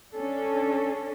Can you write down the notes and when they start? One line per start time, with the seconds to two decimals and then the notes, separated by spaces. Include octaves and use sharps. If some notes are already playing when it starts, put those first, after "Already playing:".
0.14 C#4 D4 A4